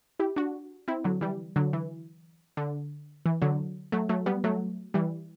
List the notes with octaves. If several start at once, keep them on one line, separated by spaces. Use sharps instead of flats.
E4 G4
D4 F#4
C4 E4
D3 F#3
E3 G3
D3 F#3
E3
D3
E3
D3 F#3
F#3 A3
F#3 A3
G3 B3
F#3 A3
E3 G3